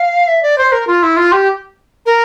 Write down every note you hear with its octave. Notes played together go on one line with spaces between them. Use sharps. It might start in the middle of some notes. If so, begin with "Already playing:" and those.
Already playing: F5
E5
D5
C5
A#4
F4
E4
F4
G4
A#4